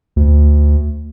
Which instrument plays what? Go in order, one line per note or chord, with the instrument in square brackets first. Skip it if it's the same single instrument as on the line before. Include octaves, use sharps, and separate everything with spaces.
[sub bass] D2